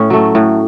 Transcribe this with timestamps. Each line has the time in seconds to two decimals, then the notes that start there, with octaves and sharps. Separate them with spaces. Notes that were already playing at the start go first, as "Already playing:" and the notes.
Already playing: A2 C#4
0.10 F#3 A3
0.35 A2